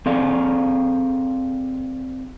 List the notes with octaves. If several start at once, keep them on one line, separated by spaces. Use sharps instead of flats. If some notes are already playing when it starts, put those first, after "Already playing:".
C4 G#4 A4 D5 F5